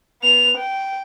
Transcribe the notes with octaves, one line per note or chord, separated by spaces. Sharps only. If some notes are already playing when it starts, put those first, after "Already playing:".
B3 F7
G5